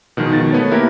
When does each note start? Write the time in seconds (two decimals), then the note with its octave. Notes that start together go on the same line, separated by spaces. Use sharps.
0.17 B2 D#3 F3 G#3
0.32 B2 D#3 A6
0.53 A3 B3 B4 C#5
0.71 A#3 E4 G4 A#4 B4